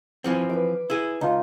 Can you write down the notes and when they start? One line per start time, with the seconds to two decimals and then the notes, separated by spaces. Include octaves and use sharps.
0.24 E3 F3 C4
0.49 B4 D6
0.90 E4 G#4
1.21 C#2 D#4 F4